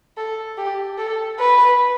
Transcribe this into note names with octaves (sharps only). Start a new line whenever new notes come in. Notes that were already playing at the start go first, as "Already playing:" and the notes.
A4
G4
A4
B4